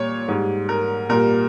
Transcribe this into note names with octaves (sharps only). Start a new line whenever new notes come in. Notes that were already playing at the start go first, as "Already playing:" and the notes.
Already playing: A#2 G3 C#5
G#2 G3
A#4
A#2 G3 A#4